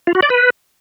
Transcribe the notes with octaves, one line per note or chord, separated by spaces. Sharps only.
F4
F#4
D5
B4